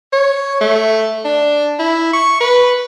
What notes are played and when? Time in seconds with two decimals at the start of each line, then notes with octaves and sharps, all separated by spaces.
0.13 C#5
0.61 A3
1.25 D4
1.79 E4
2.13 C#6
2.40 B4